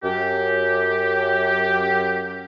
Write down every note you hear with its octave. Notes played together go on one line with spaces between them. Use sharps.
F#2 G4